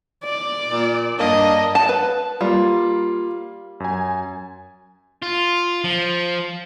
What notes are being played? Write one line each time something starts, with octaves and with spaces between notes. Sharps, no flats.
D5
A#2
G2 A#3 D4 D#5
F#5 A5
B4
G3 A#3 F4
F#2 G#5
F4
F3